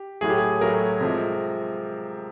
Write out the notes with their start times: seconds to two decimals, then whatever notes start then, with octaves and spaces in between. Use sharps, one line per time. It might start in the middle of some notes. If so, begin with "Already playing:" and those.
Already playing: G4
0.21 A2 F#3 A3 G#4
0.29 G4
0.38 G#4
0.61 A2 F#3 A3 A#4
1.01 C3 F3 G#3